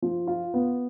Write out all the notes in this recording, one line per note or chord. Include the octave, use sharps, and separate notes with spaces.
F3
F4
B3